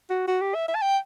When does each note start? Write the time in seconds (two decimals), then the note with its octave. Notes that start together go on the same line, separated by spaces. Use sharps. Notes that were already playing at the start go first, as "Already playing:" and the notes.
0.10 F#4
0.28 F#4
0.41 G4
0.55 E5
0.68 E5
0.75 A5
0.82 G5